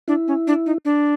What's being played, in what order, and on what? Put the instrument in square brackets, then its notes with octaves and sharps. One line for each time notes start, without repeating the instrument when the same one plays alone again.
[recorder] D4 [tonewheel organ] E4
[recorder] C#4
D4
D#4
D4